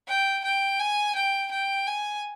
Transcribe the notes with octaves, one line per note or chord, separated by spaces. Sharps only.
G5
G5
G#5
G5
G5
G#5